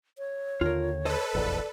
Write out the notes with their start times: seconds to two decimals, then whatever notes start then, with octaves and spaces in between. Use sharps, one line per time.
0.18 C#5
0.61 D#2 D3 F4 A#4
1.05 A4 B4 C5 D#5
1.34 F1 A#1 E2 D5